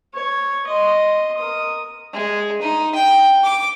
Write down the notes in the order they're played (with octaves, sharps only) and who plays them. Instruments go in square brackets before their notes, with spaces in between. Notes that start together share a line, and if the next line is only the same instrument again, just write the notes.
[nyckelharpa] C#5
D#5 C6
A#4 D#6
[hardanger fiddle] G#3
D#4
G5
D6